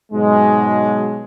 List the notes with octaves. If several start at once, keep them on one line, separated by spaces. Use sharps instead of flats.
G#2 B2 F#3 G#3